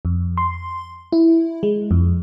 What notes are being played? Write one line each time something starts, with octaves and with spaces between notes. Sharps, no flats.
F2
C6
E4
G#3
F2